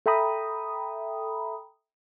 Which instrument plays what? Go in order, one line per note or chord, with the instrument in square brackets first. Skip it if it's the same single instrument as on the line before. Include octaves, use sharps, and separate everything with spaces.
[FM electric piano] A4 E5 G5 A#5 B5 D#6